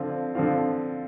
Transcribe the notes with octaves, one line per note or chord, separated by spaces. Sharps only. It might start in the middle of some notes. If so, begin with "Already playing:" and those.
Already playing: D3 F3 C4 F4
D3 F3 C4 F4